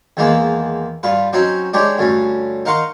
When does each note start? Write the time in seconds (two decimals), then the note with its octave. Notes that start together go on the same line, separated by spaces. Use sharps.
0.17 E2 D#3 E3 G#3 A#3 B3
1.03 G2 F4 B4
1.33 F#3 C4 C#4 D#4
1.73 G#3 D4 D#4 G4 C#5
1.98 D2 G2 C#4
2.65 D#4 A#4 F5 F#5 C6 C#6